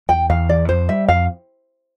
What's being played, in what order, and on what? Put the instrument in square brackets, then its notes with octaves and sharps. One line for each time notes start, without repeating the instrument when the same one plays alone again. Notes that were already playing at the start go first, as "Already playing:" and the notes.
[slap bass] E2 [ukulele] G5
[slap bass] E2 [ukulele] F5
[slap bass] E3 [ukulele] D5
[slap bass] F2 [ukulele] C5
[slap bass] G3 [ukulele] E5
[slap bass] F2 [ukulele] F5